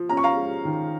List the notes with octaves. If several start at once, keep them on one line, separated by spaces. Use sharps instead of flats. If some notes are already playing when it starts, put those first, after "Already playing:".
Already playing: F3
C#4 A#5
C#6
F5 A#5
G#3
D#3